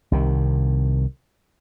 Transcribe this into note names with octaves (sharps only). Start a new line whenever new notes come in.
C2 C3 D#3